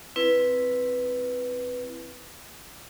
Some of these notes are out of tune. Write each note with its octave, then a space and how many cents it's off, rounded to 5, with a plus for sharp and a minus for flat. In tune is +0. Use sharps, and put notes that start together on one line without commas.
C4 +0 E4 +5 B4 +0